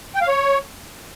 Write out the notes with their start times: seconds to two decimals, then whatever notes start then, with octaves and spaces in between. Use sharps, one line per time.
0.15 G5
0.21 F5
0.28 C#5